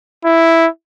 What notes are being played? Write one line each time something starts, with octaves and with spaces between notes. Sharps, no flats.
E4